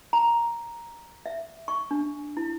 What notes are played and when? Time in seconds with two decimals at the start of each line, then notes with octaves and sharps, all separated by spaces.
0.13 A#5
1.26 E5
1.68 C#6
1.91 D4
2.37 E4